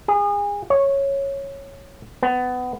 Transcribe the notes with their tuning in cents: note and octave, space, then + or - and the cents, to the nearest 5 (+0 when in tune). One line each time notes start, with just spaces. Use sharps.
G#4 -30
C#5 -5
B3 +20